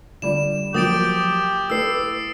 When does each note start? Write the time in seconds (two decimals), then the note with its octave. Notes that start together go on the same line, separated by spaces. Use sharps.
0.22 D3 G3 F4 E7
0.74 F3 F#3 A#3 G4 D#6 A6 D7
1.70 A3 E4 B4 E6 C7